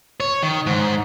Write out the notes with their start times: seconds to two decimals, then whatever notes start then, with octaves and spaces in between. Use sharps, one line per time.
0.20 C#5
0.43 D#3
0.66 G#2